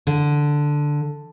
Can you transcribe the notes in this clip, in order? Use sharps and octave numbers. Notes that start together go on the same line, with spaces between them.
D3